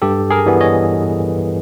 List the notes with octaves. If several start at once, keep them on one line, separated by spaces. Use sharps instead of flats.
G2 G4 A4
G#4 A#4
E3 G3 B3
C#5 D#5